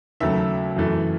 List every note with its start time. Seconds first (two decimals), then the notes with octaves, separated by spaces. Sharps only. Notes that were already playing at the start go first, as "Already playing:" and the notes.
0.20 D#2 C#3 F#3 A3 E5
0.76 F#2 E3 A3